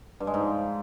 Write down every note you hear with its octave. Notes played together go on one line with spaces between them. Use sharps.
G2
G#3
G#2
F3